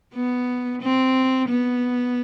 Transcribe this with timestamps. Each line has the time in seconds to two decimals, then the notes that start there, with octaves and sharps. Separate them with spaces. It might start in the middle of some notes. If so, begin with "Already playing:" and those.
0.15 B3
0.82 C4
1.49 B3